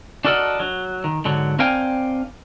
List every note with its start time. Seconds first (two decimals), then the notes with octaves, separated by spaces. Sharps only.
0.25 D4 F#4 A4 A#4 D#5 F#5
0.60 F#3
1.04 D#3
1.25 G#2 D3 F#3
1.59 C4 D4 A#4 F5 G5 G#5